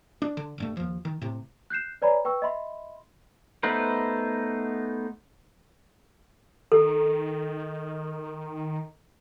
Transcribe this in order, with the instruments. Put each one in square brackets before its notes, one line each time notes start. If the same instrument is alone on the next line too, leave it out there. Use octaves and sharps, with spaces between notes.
[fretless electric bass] D4
D3
D#1 G2 A3
D#2 F3
D#3
A2 C3
[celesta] F#6 G6 C7 E7
B4 C#5 D5 G#5 A#5 B5
B4 G5 C#6 E6
D#5 E5 B5 C6
[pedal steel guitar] A3 B3 D#4 B4 C5
[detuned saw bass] D#3 [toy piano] A4